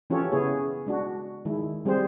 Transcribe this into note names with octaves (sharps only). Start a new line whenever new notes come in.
E3 C#4 F4 G4 A4 C#5
C#3 B3 E4 G#4 C#5
G#3 D4 F#4
D#3 G#3 E4
G3 C4 G4 G#4 C5